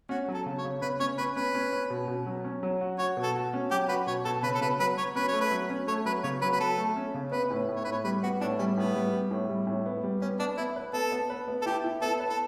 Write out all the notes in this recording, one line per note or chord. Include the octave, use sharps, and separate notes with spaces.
C#4 F#4
F#3
A4
C#3
C#5
C#3
C#3 B4
C#4 C#5
C#4 B4
C#4 B4
C#4
C#4
B2
B2
F#3
C#4
F#3
F#4
F#4 C#5
B2
A4
F#4
C#4
F#3 G4
F#4 B4
B2 C#5
B2 A4
C#3 B4
A4
C#3 B4
F#3 B4
F#3 C#5
C#4 B4
C#5
A3
B4
F#3
C#4
A3 C#5
F#3 B4
C#3 C#5
F#3 B4
B4
F#3 A4
A3
C#4
C#3
B3 B4
A2
A2
C#5
A2 B4
C#5
G3 B4
B3 F#4
A2 D4
G3 C#4
A2 B3
G3
G3
A2
G3
A2
B3
G3
B3 C#4
B3 D4
B3 E4
B4
B3 A4
B3
B4
B3
A4
E4 G4
E4
B3 A4
B4
A4